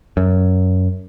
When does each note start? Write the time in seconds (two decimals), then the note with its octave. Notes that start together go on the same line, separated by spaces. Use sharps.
0.17 F#2